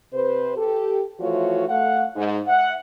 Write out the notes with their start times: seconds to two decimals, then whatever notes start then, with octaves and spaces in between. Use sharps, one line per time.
0.13 C3 B4 C5
0.57 G4 A4
1.20 E3 F3 A3 F4 F#4 C#5
1.68 A3 F5 F#5
2.16 G#2
2.47 E5 F#5